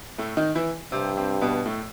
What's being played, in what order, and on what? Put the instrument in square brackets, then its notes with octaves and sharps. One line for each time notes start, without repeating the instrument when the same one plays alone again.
[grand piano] A2 A3
D#3 D#4
E3 E4
[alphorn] G2 [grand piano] C3 C4
[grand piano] C3 C4
B2 B3
A2 A3